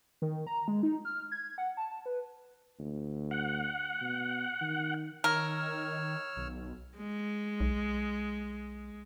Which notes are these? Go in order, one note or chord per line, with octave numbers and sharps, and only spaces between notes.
D#3
A#5
G#3
D#4
F6
G#6
F#5
A5
B4
D2
F#5
B2
D#3
D#3 A#4 C#5 E6 F6
B1
G#3
B1